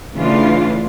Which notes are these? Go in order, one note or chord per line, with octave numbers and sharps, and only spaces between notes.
C#3 E3 A3 D4 F4